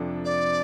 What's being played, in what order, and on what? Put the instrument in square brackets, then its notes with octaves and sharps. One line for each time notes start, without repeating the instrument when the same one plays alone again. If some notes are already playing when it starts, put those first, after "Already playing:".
Already playing: [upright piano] F2 C3 F3 D4 A4
[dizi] D5